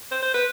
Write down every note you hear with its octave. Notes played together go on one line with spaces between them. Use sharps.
C5
C5
B4